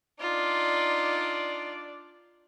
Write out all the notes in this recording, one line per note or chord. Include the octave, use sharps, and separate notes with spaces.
D4 D#4 F4 D5